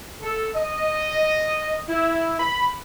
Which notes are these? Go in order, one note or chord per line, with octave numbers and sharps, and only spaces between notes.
A4
D#5
E4
B5